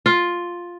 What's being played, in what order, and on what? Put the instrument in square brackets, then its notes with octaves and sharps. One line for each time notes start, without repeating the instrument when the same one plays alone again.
[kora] F4